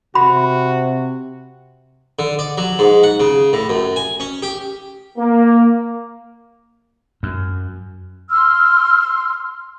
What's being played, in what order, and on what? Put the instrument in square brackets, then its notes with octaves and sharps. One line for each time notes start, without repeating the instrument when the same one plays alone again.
[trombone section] C3 [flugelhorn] F#4 [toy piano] B5
[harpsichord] D3
D5
F#3
G#2
F#5
C#3
A2
F#2
G#5
C#4
G4
[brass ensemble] A#3
[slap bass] F#2
[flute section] C6 E6 F6